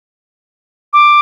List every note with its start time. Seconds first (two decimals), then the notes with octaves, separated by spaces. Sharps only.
0.93 D6